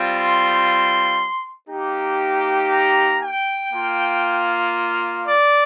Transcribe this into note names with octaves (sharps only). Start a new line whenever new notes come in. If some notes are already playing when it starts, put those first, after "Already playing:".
Already playing: G3 C4 F4
C6
A#3 D#4 G4
A#5
G5
A#3 F4
D5